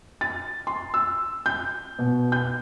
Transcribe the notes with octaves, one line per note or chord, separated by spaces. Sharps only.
A6
C6
E6
G6
B2
G6